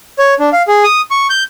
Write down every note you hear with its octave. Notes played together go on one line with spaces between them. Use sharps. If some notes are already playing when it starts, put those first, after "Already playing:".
C#5
D4
F5
G#4
D#6
C#6
G6